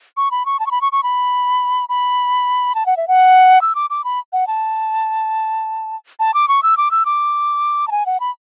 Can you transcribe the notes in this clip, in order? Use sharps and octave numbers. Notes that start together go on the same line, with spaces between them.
C#6
B5
C#6
A5
C#6
B5
C#6
C#6
B5
B5
A5
F#5
E5
F#5
E6
D6
D6
B5
F#5
A5
A5
D6
C#6
E6
D6
E6
D6
A5
G#5
F#5
B5